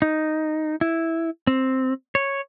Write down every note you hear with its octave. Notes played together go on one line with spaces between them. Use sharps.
D#4
E4
C4
C#5